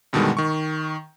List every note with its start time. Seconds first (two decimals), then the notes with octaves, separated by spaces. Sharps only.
0.13 G2 B2 D3 D#3 G3 G#3
0.37 D#3 C#6